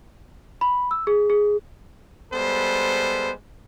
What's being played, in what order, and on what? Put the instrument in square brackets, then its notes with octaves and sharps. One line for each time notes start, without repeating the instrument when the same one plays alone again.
[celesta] B5
E6
G#4
G#4
[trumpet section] G3 G#3 B3 A4 C5